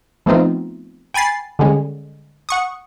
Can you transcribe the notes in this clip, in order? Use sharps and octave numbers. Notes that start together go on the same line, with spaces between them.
F3 A3 B3 C4 D#4 F4
G5 G#5 B5 A6 C7
D3 G3 G#3 C#4
F#5 C#6 D#6